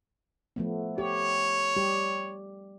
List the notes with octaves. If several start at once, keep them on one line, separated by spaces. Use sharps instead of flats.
F3 A3 B3
G4 C#5
G3 G4